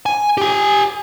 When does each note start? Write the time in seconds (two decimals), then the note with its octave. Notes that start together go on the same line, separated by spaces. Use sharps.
0.06 G#5
0.38 G4 G#5